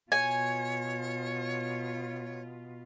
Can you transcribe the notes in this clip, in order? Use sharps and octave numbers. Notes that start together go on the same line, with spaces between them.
B2 F4 C#5 G#5